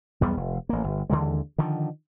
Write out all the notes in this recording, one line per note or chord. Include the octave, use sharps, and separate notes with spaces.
B1 E2 G3 B3
F1
A1 A#3
G1
D#2 D3 E3 G#3
D3 D#3 F3